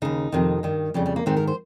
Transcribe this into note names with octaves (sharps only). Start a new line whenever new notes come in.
D#2 C#3 D#4
F2 C3 D#3
G2 D#3
F2 C#3 G3
G3
A#3
G#2 D#3 C4
A#4
C5